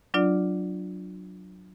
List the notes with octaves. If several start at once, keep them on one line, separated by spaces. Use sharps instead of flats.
F#3 D4 F4 D5